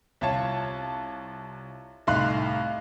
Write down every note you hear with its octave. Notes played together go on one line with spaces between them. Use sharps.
C2 F4 C#5 A5
C2 A2 D#4 F5 C6 F#6